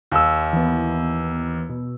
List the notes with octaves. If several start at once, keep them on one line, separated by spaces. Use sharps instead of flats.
D#2 E6
E3 B3
B2